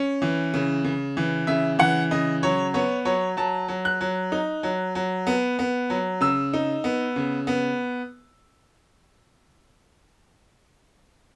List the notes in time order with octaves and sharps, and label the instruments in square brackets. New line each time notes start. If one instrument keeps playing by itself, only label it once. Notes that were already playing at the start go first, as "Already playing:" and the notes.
Already playing: [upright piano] C#4
E3
C#3
C#3
E3
C#3 E5
E3 F#5
C#3 D#5
F#3 C#5
B3 C#5
F#3 C#5
F#3 A5
F#3
F#6
F#3
D#4
F#3
F#3
B3
B3
F#3
C#3 E6
D#4
B3
C#3
B3